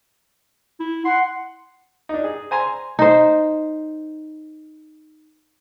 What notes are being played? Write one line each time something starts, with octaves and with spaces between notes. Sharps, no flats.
E4
F#5 C6
D4 D#4
G#4
C5 G#5 A#5 C6
D#4 C5